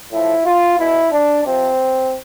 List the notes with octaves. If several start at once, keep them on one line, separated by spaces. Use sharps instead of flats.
A2 F3 E4
F4
B2 E4
D4
C3 F3 C4